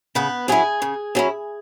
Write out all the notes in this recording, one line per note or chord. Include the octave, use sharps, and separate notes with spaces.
C#3 B3 B4
F#3 C#4 E4 G#4 G#5
C#3
F#3 C#4 E4